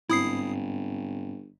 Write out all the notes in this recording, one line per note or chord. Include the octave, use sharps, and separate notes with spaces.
G1 G#2 C4 E4 D#6 C7